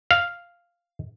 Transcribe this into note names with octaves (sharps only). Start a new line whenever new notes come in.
F5